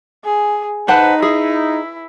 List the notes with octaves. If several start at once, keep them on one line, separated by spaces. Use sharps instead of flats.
G#4
D#4 B4 C5 F#5 A5
E4 G#4